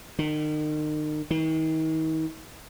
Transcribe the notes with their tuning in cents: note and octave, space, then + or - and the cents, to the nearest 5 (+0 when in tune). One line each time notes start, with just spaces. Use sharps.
D#3 -35
D#3 +40